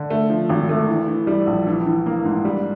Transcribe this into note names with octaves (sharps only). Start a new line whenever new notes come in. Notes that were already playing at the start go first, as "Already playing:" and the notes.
Already playing: D3
A3
F3
G#1
A3
E3
E3
G3
A#1
E3
E3
A#3
G#2
G3